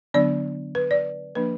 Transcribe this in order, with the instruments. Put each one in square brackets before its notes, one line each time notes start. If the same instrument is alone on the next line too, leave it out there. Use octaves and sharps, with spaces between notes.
[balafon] D3 F#3 B3 D4 D5
B4
D5
F3 A#3 D4 B4